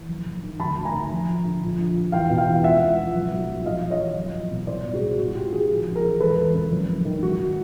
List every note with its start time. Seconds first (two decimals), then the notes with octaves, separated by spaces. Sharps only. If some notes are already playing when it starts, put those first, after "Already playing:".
Already playing: E3
0.09 F#1
0.25 F#1
0.43 D#3
0.59 D2 A5 B5
0.76 D2
0.85 G#5 A#5
0.94 D#3
1.11 F1
1.28 F3
1.44 D3
1.62 A#1
1.78 A#1
1.96 F3
2.12 E2 F5 G5
2.30 B2
2.38 F5 G5
2.47 E2
2.63 C#2 E5 F#5
2.81 C#2
2.97 F3
3.15 B1
3.32 B1
3.48 F3
3.65 A#1 D#5 F5
3.83 A#1
3.91 C#5 D#5
3.99 E3
4.16 F#1
4.34 F#1
4.51 B2
4.67 C2 C5 D5
4.84 B2
4.93 F#4 G#4
5.01 C2
5.18 C#2 F#4
5.35 C#2 F4 G4
5.52 D#3 F#4 G#4
5.70 A#1
5.86 A#1
5.95 G#4 A#4
6.03 E3
6.20 E1 A4 B4
6.37 E1
6.54 C#3
6.71 F#1
6.89 F#1
7.05 D#3
7.22 G#1 F#4